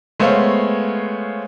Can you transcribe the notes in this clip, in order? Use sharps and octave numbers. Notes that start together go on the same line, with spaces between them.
G#3 A3 B3 C5 C#5 F5